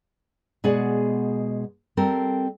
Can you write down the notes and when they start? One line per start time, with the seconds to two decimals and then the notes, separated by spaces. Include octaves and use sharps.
0.64 B2 G#3 G#4 D5 F#5
1.97 G3 C4 A4 A#4